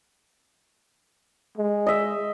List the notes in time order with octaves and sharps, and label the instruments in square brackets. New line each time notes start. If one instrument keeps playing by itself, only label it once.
[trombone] G#3
[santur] D#5 E5